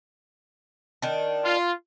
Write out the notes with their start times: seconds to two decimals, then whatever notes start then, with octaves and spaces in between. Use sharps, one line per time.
1.02 D#3 D4
1.45 F4